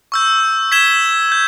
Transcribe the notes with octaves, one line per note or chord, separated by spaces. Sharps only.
C#6 E6 G6
G#6 B6 E7 G7
G6